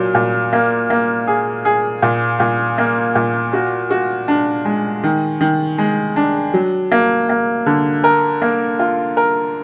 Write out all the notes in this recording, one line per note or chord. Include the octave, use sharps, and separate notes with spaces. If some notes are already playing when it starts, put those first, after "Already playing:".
Already playing: A#2 F#3
A#2
A#3
A#3
G#4
G#4
A#2
A#2
A#3
A#2
F#4
F#4
D4
G#3
D#3
D#3
G#3
D4
F#3
A#3
A#3
D3
A#4
A#3
F4
A#4